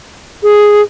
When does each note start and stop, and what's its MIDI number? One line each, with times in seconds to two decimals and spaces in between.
0.43 0.82 68